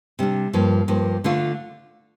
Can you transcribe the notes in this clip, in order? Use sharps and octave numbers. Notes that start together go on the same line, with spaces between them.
C3 G3 D4
G2 F3 A#3
G2 F3 A#3
D3 A3 D4 F4